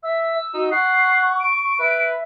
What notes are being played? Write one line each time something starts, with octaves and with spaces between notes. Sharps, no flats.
E5 E6
D#4 F#4
F#5 C#6 C7
D7
B4 E5